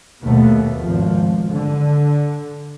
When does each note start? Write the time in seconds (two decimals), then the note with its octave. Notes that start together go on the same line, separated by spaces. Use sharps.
0.23 D#2 B2 A3 B3
0.81 G#1 F3
1.52 D3